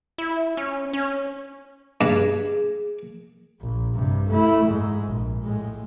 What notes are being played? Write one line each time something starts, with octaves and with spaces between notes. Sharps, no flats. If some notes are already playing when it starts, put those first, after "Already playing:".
E4
C#4
C#4
G2 G#4
A#1
G2 C3
A3 E4
G#2 G#3
A#1
A2 G#3